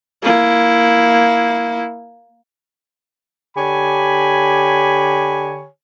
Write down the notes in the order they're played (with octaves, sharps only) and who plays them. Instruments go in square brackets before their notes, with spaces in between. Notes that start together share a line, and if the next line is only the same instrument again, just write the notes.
[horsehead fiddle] A#3 E4
[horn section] D3 G4 C#5 G#5 B5